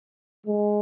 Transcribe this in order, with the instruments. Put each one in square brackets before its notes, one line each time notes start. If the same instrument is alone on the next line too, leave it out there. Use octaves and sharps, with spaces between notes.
[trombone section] G#3